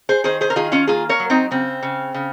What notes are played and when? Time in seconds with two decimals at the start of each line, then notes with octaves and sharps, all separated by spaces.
0.09 G#4 C5
0.24 D#3 G#4 C5
0.41 G#4 C5
0.50 A#4
0.56 D#3 F4 G#4
0.72 C#4 F4
0.87 A#3 F4 G#4
1.09 A#4 C#5
1.20 F#3
1.30 C4 D#4
1.51 C#3 C4
1.83 C#3
2.14 C#3